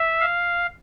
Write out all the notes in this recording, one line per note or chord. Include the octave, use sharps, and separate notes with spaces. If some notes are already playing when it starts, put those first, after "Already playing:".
Already playing: E5
F5